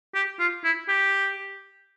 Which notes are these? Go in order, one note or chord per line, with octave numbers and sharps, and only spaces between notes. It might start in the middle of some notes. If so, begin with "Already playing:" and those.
G4
F4
E4
G4